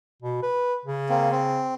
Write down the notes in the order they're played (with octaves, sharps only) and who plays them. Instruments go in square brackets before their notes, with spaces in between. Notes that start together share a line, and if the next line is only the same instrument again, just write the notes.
[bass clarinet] B2
B4
C#3
[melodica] A#3 C4
C4